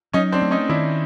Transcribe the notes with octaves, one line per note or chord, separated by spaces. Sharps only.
F#3 C#4 D#4
C4 D4
A3
C#4 D#4
D#3 D4 E4